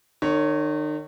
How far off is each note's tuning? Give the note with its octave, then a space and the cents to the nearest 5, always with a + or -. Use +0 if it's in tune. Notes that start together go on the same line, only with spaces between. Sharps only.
D#3 -40 C#5 +0